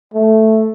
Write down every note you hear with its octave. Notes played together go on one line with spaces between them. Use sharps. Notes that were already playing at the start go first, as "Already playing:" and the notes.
A3